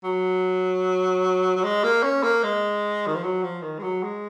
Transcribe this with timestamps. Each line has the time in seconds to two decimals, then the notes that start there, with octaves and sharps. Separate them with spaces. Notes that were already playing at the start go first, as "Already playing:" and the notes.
0.04 F#3
1.56 F#3
1.64 G#3
1.84 A#3
2.03 C#4
2.23 A#3
2.43 G#3
3.07 D#3
3.15 F3
3.23 F#3
3.43 F3
3.62 D#3
3.79 G#3
3.83 F#3
4.03 G#3